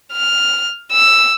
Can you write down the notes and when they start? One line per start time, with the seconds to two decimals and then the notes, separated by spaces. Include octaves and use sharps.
0.13 F6
0.93 E6